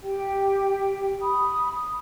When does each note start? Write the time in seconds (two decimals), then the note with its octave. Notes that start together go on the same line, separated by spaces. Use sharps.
0.01 G4 G5
1.22 B5 D#6